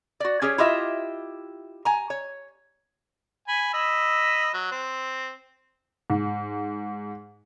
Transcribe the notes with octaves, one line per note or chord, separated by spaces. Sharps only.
F#4 D5
C#4 G4 G#4 C#5
E4 F4 G4 D#5 E5
G#5 A#5
C#5
G#5 B5
D#5 B5 E6
F#3
C4
G#2